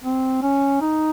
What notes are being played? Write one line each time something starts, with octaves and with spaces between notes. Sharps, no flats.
C4
C#4
D#4